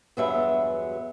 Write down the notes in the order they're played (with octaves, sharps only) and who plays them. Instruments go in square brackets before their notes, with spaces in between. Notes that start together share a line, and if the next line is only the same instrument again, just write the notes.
[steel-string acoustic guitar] E2 G2 F#3 G#3 B3 E5